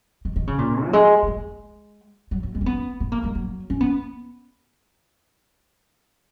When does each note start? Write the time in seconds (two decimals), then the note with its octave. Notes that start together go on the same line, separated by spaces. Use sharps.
0.25 D#3
0.36 D#3
0.47 C#3
0.58 A#2
0.86 F#3
0.93 G#3
1.23 F#3
1.27 G#3
2.31 F#3
2.43 F#3
2.55 G#3
2.61 C#4
2.66 B3
3.00 B3
3.12 A#3
3.24 G#3
3.35 F#3
3.70 C#4
3.81 B3